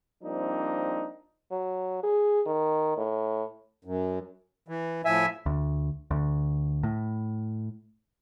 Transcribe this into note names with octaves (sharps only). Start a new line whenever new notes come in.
F3 G3 A#3 C4 D4 D#4
F#3
G#4
D#3
A2
F#2
E3
A2 F3 E5 G#5
D2
D2
A2